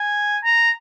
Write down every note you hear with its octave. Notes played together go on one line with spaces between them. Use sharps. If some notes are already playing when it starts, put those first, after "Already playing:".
Already playing: G#5
A#5